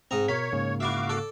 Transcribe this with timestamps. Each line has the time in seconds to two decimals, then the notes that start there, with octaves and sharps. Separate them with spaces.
0.11 G#2 C4 D#5 A#5
0.28 B2 A#4 C#5 F5 B6
0.52 G#2 C#3 A#3
0.80 E4 F#4 D5 E5 F5 D6
1.09 A4 D5